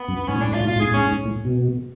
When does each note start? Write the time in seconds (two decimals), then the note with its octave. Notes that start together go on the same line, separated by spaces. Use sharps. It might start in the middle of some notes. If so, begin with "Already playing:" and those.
Already playing: B3
0.08 F#2
0.28 G#2 C#4
0.36 A2
0.41 G#2 D4
0.52 A2 F4
0.60 G#2
0.67 A2 F4
0.76 G#2
0.80 A2 G#4
0.92 G#2 C#4
1.07 G#2
1.25 A2
1.45 B2